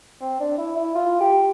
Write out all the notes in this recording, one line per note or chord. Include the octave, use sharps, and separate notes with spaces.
C4
D4
E4
E4
F4
G4